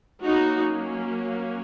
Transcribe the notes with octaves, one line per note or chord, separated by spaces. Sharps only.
F#3 A#3 C#4 D#4 F#4